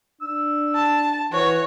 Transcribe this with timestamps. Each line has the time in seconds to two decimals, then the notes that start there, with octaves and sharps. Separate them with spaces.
0.21 D4 E6
0.75 A5
1.32 E3 F#4 C#5